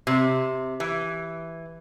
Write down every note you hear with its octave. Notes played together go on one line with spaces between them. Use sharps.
C3
E3